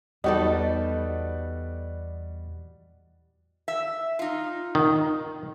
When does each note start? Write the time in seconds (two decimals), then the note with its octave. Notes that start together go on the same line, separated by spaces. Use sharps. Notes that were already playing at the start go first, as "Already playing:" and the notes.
0.24 E2 G3 B3 D#4 F#4 A4 D5 D#5
3.68 E5
4.19 D#4 F4
4.75 D#3